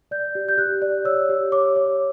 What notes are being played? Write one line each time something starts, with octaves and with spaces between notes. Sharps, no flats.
D5 G6
G4
G6
G4 F#6
D5
C#5 E6
G4
C#5 D6
C#5